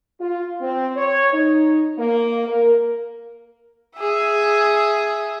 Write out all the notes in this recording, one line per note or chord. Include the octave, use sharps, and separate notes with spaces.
F4
C4
C#5
D#4
A#3
A#4
G#4 E5